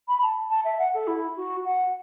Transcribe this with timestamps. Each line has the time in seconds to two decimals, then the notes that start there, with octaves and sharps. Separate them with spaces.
0.08 B5
0.23 A5
0.50 A5
0.65 E5
0.79 F#5
0.94 A4
1.07 E4
1.36 F#4
1.65 F#5